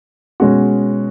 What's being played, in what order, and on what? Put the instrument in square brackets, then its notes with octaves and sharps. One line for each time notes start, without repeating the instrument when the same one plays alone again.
[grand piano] B2 G#3 C#4 F#4